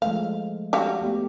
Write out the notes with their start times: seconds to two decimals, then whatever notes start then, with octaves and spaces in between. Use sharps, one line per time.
0.02 F3 G#3 A3 F5
0.73 G3 F#4 F5
1.01 A3 B3 G4